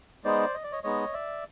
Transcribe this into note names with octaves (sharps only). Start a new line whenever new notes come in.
G#3 B3 D#4 C5 D5
D#5
D5
C#5 D#5
G#3 B3 D#4 C#5 D#5
D5 E5